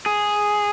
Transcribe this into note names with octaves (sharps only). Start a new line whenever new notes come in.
G#4